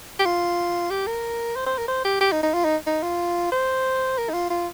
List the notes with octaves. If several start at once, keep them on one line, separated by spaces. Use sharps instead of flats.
G4
F4
G4
A#4
C5
C5
A#4
C5
G4
G4
D#4
D#4
F4
D#4
D#4
F4
C5
A#4
D#4
F4
F4